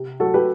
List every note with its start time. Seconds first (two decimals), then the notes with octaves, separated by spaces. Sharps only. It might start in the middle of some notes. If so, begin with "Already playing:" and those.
Already playing: C3
0.20 F#3 F#4 A4
0.34 G4 B4